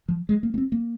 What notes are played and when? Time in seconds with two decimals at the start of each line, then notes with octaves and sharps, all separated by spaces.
0.09 F3
0.29 G#3
0.43 A#3
0.54 A#3
0.58 C4
0.72 A#3